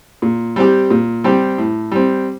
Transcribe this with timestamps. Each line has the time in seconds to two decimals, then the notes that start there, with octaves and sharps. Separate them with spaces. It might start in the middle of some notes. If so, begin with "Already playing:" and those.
0.22 A#2
0.56 G3 C4 G4
0.90 A#2
1.24 G3 C4 G4
1.58 A2
1.92 G3 C4